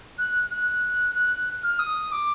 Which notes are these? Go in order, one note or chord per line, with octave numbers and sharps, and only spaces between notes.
F#6
F#6
F#6
F6
D#6
D6